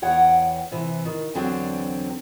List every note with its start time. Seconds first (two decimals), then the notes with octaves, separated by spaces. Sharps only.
0.02 E2 C#5 F#5 G5
0.71 C3 E3
1.05 D#3
1.34 E2 D3 F#3 C4 D4 G5